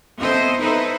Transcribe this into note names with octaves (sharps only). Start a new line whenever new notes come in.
B3 C4 E4 A4 C5 D#5
D#4 E4 A4 B4 C5